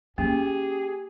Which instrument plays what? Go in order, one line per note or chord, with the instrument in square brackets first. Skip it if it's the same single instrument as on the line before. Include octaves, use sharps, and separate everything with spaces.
[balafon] A#3 [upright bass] C#4 [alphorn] G4 [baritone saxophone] G#4